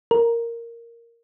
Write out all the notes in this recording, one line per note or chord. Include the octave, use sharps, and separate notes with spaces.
A#4